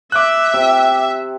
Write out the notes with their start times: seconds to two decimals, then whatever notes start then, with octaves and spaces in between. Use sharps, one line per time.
0.12 E5 D6 F#6
0.54 C3